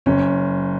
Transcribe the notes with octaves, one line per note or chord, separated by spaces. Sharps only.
F#1 C#4